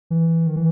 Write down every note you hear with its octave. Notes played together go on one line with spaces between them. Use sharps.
E3
D#3
E3